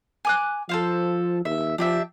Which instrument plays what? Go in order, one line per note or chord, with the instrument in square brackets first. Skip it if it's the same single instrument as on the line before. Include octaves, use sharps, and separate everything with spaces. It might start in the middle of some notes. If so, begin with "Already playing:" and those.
[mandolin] G#5 D6 F#6
[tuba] F3 [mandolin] A4 C5 F5
[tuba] D#2 [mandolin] E5
[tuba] F3 [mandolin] D4 G4 E5